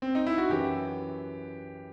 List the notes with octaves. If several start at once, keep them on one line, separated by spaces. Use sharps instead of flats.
C4
D#4
E4
F#4
F#2 E3 G4